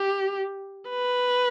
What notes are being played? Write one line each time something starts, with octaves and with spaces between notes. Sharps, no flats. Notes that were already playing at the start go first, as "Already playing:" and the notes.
Already playing: G4
B4